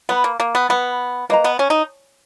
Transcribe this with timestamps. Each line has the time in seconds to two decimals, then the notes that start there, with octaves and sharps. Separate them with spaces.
0.09 B3 B4 F#5 B5
0.24 A#3
0.40 A#3
0.55 B3
0.69 B3 B4 F#5 B5
1.29 A#3 B4 D#5 A#5
1.44 B3
1.59 C#4
1.70 D#4